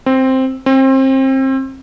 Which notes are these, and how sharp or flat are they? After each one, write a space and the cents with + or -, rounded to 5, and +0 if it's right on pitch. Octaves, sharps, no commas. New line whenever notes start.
C4 +5
C4 +30